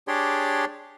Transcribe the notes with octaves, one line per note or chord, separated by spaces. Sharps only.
D4 G4 G#4 C#5 D5 C6